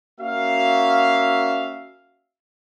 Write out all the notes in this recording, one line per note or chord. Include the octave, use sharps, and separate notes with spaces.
A#3 C#4 F#4 E5 F5